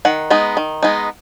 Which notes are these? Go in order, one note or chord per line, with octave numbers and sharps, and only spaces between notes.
D#3 F#5
G#3 B3 D#4
D#3
G#3 B3 D#4